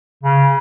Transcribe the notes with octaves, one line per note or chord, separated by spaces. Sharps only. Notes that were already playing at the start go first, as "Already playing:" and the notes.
C#3